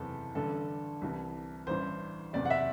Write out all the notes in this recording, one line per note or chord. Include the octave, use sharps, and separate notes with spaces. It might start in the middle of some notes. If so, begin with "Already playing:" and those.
Already playing: F#1 E2 C3 E3 A4
A1 G2 D3 A4
C2 C3 E3
A1 G2 E3 C5
F#1 E2 C3 D5
F#5
E5